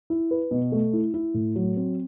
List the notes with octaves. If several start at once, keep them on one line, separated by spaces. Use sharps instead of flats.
E4
B4
B2
A3
E4
E4
A2
F#3
C4